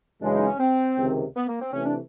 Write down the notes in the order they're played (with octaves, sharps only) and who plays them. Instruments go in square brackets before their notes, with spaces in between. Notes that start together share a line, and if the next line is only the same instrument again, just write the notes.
[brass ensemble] F#2 C#3 E3 G#3 [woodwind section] D4
[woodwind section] D#4
C#4
C4
[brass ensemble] C#2 C3 D#3
[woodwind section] B3
A#3
C4
[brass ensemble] C3 E3 A3 [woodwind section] C#4
[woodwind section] D4